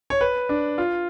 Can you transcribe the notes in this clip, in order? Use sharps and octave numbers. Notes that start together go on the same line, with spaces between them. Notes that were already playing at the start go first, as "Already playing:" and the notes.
C#5
B4
D4
F4